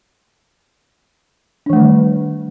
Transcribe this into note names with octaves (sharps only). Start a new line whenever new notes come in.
D#3 E3 G3 A3 D4